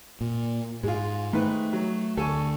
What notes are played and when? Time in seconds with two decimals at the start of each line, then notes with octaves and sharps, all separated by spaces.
0.21 A#2
0.83 G#2 G#3 F4
1.33 G#2 D#3 A3 B4
1.73 F#3
2.17 D2 A4 G#5 C#6